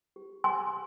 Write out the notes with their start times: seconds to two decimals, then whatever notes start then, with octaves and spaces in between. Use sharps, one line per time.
0.16 G4
0.44 G4 G#5 C6